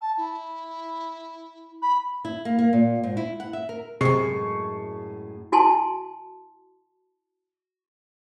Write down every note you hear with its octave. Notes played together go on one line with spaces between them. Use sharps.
A5
E4
B5
E4
A#3
A#3
A#2
G#2
E4
F#5
E5
A#4
F#2 A2 C3 G#3 G#4 C#6 C7
E4 F#4 G#5 A5 C6